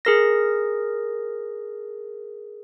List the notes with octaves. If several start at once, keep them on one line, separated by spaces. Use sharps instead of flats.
G#4 A#4 A#6